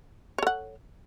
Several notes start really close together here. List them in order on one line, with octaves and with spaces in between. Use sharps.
C#5 A4 F#5